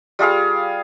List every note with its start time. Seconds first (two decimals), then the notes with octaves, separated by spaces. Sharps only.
0.19 G3 F4 G#4 F5